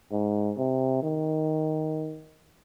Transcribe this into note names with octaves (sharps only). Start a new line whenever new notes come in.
G#2
C3
D#3